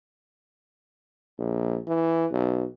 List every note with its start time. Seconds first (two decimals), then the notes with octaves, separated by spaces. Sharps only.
1.39 A#1
1.88 E3
2.31 B1